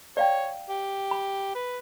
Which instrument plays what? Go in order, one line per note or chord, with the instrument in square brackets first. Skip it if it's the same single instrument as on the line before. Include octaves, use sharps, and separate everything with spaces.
[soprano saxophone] C#5 [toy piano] D5 F5 G5
[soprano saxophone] G4
[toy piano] B5
[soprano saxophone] B4